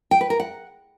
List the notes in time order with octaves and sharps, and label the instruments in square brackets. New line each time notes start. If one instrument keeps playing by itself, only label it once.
[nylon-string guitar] G5
B4
A#4
F#5